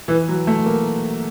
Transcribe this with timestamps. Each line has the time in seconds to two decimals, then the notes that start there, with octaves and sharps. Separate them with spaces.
0.08 E3
0.28 F#3
0.47 A3
0.66 A#3